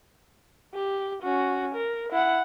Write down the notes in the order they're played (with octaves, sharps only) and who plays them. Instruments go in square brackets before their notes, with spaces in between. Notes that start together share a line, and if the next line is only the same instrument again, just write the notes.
[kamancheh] G4
C#4 F#4
A#4
E4 F#5